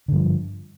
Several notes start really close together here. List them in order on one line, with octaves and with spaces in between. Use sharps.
D3 G2 F3